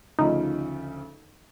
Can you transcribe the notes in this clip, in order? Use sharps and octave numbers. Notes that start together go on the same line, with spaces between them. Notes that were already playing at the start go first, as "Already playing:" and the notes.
D2 C#3 F3 D#4